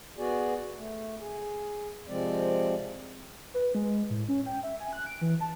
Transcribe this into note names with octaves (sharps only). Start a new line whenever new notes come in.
B3 F#4 G#4 D5
A3
G#4
C3 F3 G#3 C4 D5
B4
G#3
A2
C#4
G5
E5
G#5
F#6
D7
E3
A5